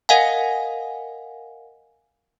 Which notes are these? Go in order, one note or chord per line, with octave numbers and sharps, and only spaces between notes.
A#4 D#5 F5 F#5 G#5